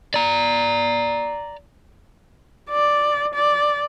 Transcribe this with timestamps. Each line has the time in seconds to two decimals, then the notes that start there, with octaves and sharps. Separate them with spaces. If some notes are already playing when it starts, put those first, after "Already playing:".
0.14 D5 A#5
2.70 D5
3.34 D5